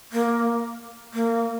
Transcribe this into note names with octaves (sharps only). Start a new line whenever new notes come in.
A#3
A#3